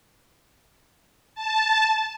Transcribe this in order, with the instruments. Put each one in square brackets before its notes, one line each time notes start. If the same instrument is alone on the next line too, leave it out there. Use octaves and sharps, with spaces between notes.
[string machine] A5